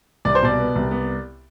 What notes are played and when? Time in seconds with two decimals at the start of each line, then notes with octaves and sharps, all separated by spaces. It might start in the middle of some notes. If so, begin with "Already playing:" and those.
0.25 C2 D5
0.35 C5
0.42 B2 D5
0.59 B3
0.75 C2
0.91 B3